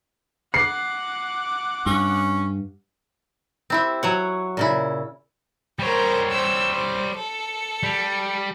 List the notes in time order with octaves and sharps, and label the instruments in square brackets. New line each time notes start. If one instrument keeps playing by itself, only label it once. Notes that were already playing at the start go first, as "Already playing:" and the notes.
[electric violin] F#5 D6 [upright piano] C7
[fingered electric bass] G2 [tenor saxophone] C#4
[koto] C4 E4 G4
F#3 C#5 F#5
A#2 C#3 E4
[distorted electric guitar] G3 C#5 [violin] A#4 C5
[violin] C5 E6
C5
A4 C#7
[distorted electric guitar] G3